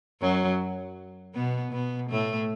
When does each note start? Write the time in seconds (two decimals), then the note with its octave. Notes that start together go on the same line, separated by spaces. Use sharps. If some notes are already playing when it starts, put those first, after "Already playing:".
0.21 F#2 F#3
1.35 B2 B3
1.72 B2 B3
2.10 A2 A3